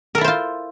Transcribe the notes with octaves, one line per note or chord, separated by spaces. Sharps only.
E4 F4 A4 A#4 C5